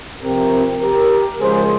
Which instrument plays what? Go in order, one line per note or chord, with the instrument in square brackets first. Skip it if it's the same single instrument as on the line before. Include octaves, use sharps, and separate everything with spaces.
[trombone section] C3 F3 C4 G4 A#4
G4 A#4
C#3 F3 G#3 G#4 C5